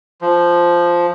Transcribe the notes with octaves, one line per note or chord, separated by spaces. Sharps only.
F3